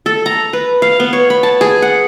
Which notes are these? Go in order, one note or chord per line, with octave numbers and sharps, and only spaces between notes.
A4
A#5
B4
F5
B3
C#5
B5
A5
G#4
F#5